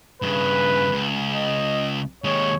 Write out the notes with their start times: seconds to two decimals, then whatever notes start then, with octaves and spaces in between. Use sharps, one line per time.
0.22 G2 C#3 B4
0.91 C#2
1.34 D#5
2.24 D#2 G#3 C#5